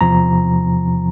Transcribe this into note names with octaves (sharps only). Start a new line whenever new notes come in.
E2 C3 F3 A#5